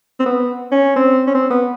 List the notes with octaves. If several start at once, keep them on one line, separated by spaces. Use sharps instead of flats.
C4
B3
C#4
C4
C#4
C4
B3